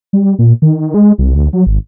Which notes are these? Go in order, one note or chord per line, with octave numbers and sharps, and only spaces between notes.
G3
A#2
D#3
G#3
C2
D2
F#3
G#1